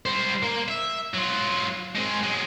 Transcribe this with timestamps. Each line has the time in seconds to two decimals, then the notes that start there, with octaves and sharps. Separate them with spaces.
0.06 G3 C5
0.43 A#3
0.68 E5
1.14 F#3 F4
1.95 G#3 C4
2.23 F#3 G#3